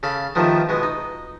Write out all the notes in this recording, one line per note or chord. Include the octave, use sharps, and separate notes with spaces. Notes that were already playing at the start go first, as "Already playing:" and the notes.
C#3 A4 F5 B5
D#2 D#3 F3 A3 B3
B2 G#3 B3
D#4